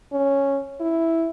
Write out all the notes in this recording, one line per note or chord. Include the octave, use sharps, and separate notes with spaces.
C#4
E4